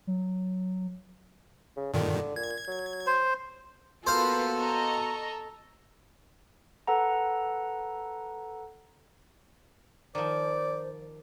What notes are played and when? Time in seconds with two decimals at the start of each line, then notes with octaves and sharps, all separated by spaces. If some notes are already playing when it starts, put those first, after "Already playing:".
0.07 F#3
1.77 C#3
1.94 G2 A#2 D3 D#3
2.36 A#2 G#6
2.68 F#3
3.07 C5
4.07 A#3 B3 F4 F#4 A4 B4 C5 F5
4.58 D#5 A#5 C#6
6.87 A4 B4 F#5 A#5
10.15 D#3 F3 C5 D5